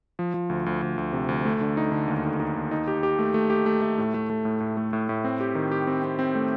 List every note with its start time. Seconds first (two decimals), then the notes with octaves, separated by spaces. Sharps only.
0.19 F3
0.34 F3
0.49 D2
0.66 D2
0.82 D2
0.98 D2
1.13 C3
1.29 D2
1.45 A3
1.61 D3
1.77 D#4
1.92 D3
2.08 D#2
2.24 D#4
2.40 D#4
2.56 D#2
2.71 D#4
2.88 G4
3.03 G4
3.19 A3
3.34 A3
3.50 G4
3.66 A3
3.82 A3
3.98 A2
4.14 A3
4.30 A3
4.45 A2
4.60 A2
4.77 A3
4.93 A2
5.09 A2
5.24 C4
5.40 G4
5.55 D#3
5.72 G4
5.87 C4
6.04 C4
6.19 C4
6.35 A3